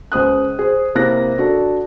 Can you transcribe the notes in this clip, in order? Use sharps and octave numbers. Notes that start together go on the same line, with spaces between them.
C#2 C5 D#6 F#6
G#4 C5
C3 A#3 E4 F#6 A#6
D4 F#4 A4 D5